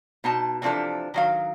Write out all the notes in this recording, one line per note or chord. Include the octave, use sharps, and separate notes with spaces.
B2 D#4 A5
C3 E3 F3 D4 A4
D#3 F#3 F5